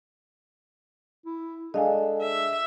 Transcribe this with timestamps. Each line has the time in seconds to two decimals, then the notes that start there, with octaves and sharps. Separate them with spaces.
1.26 E4
1.74 G#3 D4 G#4 A4 D#5 F5 G#5
2.22 E5